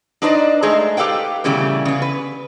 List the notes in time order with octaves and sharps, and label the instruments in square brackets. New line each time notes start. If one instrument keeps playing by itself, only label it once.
[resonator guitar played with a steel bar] D4 D#4 B4 C5 D5 D#5
G#3 A3 D#4 G#4 C5
G4 A4 B4 F5 G5
A#2 C#3 E3 G3 A3 B3
C#3 B3
B4